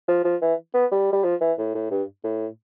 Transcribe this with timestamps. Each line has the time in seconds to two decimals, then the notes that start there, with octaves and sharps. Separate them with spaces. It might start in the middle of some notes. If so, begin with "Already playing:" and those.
0.08 F3
0.24 F3
0.42 E3
0.74 B3
0.92 G3
1.13 G3
1.24 F3
1.41 E3
1.58 A2
1.75 A2
1.91 G2
2.24 A2